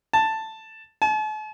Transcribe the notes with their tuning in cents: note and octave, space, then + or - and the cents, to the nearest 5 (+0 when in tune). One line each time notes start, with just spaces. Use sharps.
A5 +5
A5 -45